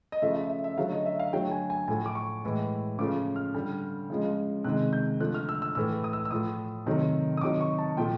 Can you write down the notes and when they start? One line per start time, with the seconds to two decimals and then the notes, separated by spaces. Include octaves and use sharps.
0.12 D#5
0.22 C#3 F3 A3 E5
0.36 E5
0.49 E5
0.64 E5
0.77 D3 F#3 A3 F5
0.92 D#5
1.06 E5
1.19 F5
1.33 D3 F#3 A3 G5
1.51 G#5
1.70 G#5
1.88 A2 F3 A3 G#5
2.06 D6
2.15 C#6
2.44 A2 E3 G#3
2.99 C#3 F3 A3 D6
3.36 F6
3.55 D3 G3
4.10 C#3 F3 G#3
4.64 C3 D#3 G#3 F#6
4.93 G6
5.20 D3 F3 A3 F#6
5.34 F6
5.49 E6
5.62 E6
5.75 A2 E3 A3 E6
6.04 D#6
6.13 E6
6.25 E6
6.31 A2 F3 A3 D#6
6.86 C3 D#3 F#3 A3
7.37 D#6
7.41 C3 D#3 F#3 D6
7.61 C#6
7.78 A5
7.97 A#2 F3 A3 G5